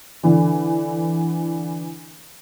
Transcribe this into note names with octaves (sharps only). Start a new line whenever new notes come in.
D3 E3